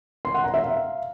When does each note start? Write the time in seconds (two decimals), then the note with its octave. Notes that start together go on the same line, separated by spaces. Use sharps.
0.25 C6
0.34 F#5
0.44 A#5
0.54 E5
0.63 F5